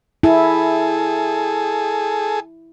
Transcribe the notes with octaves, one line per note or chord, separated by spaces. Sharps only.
E4 G#4 A4